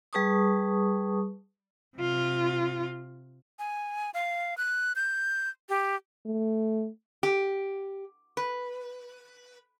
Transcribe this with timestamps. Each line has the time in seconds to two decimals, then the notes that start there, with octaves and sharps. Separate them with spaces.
0.13 G3 G#4 B4 A5 C#6 D#6
1.97 C3 F4
3.59 G#5
4.14 F5
4.58 F#6
4.96 G6
5.69 G4
6.26 A3
7.23 G4
8.37 B4